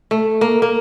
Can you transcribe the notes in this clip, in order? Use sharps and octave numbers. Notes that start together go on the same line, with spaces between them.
A3
A#3
A#3